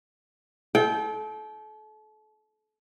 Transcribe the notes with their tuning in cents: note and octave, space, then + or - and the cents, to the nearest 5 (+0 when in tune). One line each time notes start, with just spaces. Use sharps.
A4 -35 G5 +0